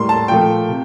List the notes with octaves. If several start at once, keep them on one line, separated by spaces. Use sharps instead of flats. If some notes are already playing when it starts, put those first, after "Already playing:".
Already playing: A2 G3 A#3 C6
A5
A#2 F3 A3 G5
C3